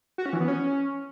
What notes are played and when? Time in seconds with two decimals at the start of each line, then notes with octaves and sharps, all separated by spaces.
0.18 F#4
0.26 C#4
0.33 E3
0.40 B3
0.48 C#4